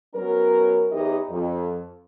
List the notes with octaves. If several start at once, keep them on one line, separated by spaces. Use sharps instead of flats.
F#3 B3 C#4 A#4
E2 D#4 E4 G4 C#5 D#5
F2